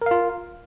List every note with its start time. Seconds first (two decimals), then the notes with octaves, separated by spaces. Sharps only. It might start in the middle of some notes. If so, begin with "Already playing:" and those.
0.02 A#4
0.06 F5
0.11 F4